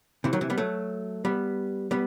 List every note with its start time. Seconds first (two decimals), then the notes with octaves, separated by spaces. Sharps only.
0.24 C3 E3
0.33 D#3 F#3
0.41 C3 E3
0.50 G3 B3
0.58 F#3 A3
1.25 G3 B3
1.91 G3 B3